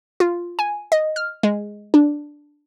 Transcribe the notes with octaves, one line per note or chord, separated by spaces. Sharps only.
F4
G#5
D#5
F6
G#3
D4